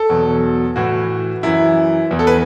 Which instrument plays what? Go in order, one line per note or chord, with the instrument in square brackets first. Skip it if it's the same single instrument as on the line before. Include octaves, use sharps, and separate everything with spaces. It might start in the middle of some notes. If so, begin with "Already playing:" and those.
Already playing: [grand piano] A4
E2 B2 F#3
A2 E3 F#4
F#2 E3 E4
E2 E3
A4
B4